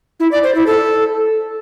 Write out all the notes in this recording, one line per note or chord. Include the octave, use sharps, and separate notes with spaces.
E4
D5
C5
E4
A4